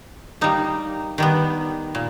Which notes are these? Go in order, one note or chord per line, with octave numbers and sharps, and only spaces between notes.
G3 A#3 D#4
D#3 G3 B3
A#2